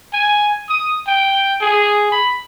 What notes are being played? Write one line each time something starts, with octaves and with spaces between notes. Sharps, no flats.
G#5
D#6
G5
G#4
B5